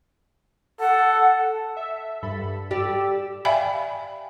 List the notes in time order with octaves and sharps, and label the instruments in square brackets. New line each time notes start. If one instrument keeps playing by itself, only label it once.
[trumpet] A4 [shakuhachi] F#5
[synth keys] E5
G2 A4 B5
[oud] G4 [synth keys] D5 E6
[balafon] D5 E5 F5 G5 G#5 B5